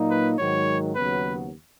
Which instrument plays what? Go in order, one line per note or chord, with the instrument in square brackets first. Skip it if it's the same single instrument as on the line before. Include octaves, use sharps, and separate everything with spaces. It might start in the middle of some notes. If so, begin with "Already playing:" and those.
Already playing: [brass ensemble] A#2 F#3 A#3 D#4
[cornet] B4
[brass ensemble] G#2 D#3 F#3 [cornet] C#5
[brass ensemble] D#2 C#3 F#3 B3 [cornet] B4